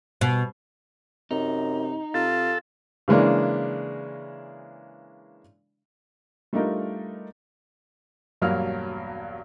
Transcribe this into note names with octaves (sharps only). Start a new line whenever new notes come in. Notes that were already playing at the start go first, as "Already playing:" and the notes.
B2
F#2 C3 D#4
C3 F4 A4
C#3 E3 G#3 A#3 D4
G3 A3 D4 D#4 F4 A#4
E1 G2 F#3 A#3 F6